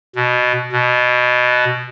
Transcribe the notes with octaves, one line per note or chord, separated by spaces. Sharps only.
B2
B2